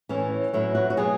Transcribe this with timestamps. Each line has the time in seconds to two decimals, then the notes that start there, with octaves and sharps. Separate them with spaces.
0.09 A2 E3 C#4
0.53 A2 F#3 E4
0.75 F#4
0.90 F#4
0.97 B2 F#3 G#4